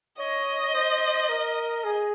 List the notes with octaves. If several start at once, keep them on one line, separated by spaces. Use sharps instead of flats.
C#5 D#5
C5
A#4
G#4